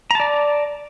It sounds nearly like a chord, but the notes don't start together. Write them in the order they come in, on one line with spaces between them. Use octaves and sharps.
A#5 A5 D5